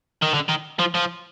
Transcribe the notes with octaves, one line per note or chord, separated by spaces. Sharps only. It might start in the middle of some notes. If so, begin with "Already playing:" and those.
D#3
D3
D#3
F3
F3